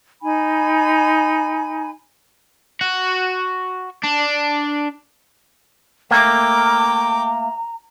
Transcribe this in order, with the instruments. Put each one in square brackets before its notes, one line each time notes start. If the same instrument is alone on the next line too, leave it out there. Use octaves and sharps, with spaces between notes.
[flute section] D#4 G#5 B5
[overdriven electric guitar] F#4
D4
[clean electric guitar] A3 A#3 [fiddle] G5 D6 [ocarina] A#5